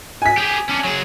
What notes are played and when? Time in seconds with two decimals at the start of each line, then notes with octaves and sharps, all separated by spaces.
0.22 G#5 B6
0.37 G4 G#4
0.69 C#4 D4
0.84 F#3 G#4